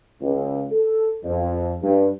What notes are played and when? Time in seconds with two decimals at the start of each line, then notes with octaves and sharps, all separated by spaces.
0.21 C#2
0.72 A4
1.24 F2
1.83 G2